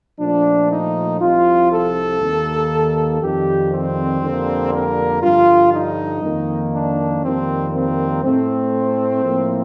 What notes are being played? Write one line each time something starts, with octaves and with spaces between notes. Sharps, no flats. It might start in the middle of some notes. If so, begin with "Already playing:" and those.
A#2 F3 A3 D4
D#4
C2 C3 F3 F4
A4
D#2 D#3 A#3
F2 D#3 G3 G4
C4
F2 D3 G3 A#3
A#4
G2 D3 F3 F4
D#4
F2 D#3 A#3
D4
F2 D#3 G3 A#3 C4
C4
A2 A3 C4
A2 F3 A#3